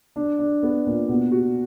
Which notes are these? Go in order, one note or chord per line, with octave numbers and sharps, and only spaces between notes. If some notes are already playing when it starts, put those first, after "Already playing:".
D4
D4
B3
A#2
B2
F#4